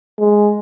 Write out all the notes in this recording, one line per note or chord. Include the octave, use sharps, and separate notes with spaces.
G#3